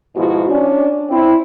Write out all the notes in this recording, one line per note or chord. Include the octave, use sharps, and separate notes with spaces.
G#2 B2 F3 E4 F#4
C#4 D4
C4 E4